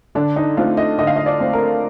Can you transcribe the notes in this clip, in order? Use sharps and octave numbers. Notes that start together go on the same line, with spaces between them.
D3 D4
D#4
A3 C4 F4
D#5
D3 D#5
F5
D#5
D5
A3 C4
A#4